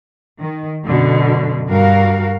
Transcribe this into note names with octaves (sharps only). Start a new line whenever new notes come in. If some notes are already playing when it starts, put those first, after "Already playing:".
D#3
F#2 B2 D3
G2 G3 F#4 A#4 F5